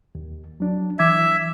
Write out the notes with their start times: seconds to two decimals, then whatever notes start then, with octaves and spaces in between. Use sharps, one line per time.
0.15 D#2
0.60 F#3 D4
0.99 E3 E5 D6 G#6